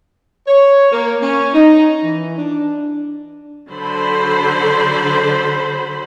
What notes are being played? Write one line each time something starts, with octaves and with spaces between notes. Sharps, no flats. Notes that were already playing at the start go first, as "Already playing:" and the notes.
C#5
A#3
C#4
D#4
E3
D4
D3 F#3 C5 B5